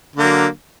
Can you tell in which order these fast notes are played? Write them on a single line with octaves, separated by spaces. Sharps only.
D3 A#3 F#3